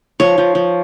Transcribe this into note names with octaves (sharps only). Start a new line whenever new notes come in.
F3 C#5
F3
F3